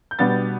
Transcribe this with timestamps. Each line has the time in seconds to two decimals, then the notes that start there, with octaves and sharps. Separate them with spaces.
0.11 G6
0.19 B2 G3 B3 D4 A6